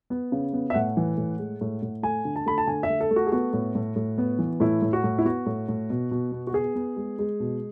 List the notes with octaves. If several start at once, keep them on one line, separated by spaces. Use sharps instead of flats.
B3
C#3
B3
E5
A2 F#5
E3
A2
G#3
A2
A2
A3 G#5
D3
A5
A3 B5
A5
D3 G#5
E5
A3
A4
A3
F#4
G#4
B3 F#4
A2
A2
A2
B3
E3
A2 E4
A2
F#4
A2
E4
B3 F#4
A2
A2
B2
B2
B3
F#4
B3 G#4
B3
G#3
G#3
B2